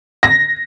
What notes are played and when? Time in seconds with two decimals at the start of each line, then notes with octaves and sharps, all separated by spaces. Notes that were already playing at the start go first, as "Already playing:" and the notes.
0.23 A#6